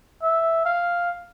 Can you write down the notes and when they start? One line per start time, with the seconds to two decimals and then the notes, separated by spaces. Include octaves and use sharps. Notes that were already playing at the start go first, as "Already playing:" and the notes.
0.23 E5
0.65 F5